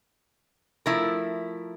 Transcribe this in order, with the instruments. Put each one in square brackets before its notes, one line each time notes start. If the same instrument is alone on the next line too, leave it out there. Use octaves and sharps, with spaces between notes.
[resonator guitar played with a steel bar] F3 A3 E4 A#4